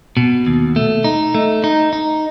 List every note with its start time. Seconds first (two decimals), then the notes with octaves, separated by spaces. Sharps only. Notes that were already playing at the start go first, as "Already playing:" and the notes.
0.17 B2
0.46 D#2
0.76 A3
1.04 D#4
1.35 A3
1.64 D#4
1.93 D#4